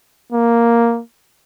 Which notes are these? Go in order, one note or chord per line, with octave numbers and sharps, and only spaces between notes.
A#3